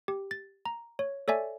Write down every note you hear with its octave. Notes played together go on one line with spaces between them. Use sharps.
G4
A6
A#5
C#5
A4 C#5 D5 E5 G#5